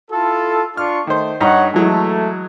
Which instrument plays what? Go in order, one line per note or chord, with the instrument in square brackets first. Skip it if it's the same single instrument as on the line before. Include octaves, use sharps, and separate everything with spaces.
[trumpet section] E4 F4 A4
[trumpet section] D4 F4 C#6 [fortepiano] F6
[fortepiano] D#3 C5 [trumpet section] A3
[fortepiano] G2 D#4 A#5 [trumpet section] C#5 F#5
[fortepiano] E3 F#3 G#3 [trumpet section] A3